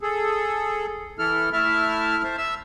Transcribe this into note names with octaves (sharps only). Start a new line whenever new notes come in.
G#4 A4
E3 E4 A4 F6
A3 E4 E5 A5 F6
C5 E5 A5
E5 E6